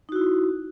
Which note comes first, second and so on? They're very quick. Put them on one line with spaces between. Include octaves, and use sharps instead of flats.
D#4 F#4 E4